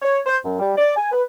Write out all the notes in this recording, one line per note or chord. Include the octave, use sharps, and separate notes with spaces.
C#5
C5
F#2
G3
D5
G#5
B4